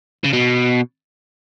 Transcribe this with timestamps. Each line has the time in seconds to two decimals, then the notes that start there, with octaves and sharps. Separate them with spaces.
0.24 C#3
0.33 B2